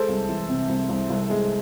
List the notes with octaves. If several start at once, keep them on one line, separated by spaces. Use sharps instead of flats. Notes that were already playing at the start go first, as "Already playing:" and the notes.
Already playing: G#3 A4 C5
C2
E3
C3
C2
C2
C2
G#3